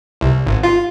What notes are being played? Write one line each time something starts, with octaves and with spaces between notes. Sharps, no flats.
C2
G#1
F4